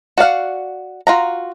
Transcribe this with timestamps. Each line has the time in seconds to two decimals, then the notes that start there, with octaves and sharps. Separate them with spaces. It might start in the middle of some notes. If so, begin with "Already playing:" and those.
0.18 F#4 D5 F5 F#5
1.07 F4 F#4 A#5